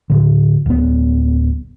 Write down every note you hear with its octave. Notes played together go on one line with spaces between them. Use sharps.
A2 D3
D1 B3